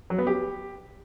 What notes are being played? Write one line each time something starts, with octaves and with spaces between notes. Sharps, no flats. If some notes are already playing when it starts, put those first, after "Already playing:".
F#3
B3
G4